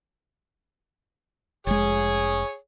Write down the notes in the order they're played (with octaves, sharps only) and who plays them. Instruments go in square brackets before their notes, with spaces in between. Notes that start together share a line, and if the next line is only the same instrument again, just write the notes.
[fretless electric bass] F1 G#3 [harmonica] G#4 C#5